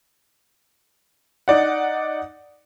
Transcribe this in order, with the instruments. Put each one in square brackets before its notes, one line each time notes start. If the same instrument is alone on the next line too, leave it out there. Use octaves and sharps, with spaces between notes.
[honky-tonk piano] D#4 D5 F#5